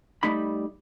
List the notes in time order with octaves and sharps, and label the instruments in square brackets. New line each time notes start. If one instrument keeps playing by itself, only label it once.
[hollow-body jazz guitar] G3 A3 D#4 B5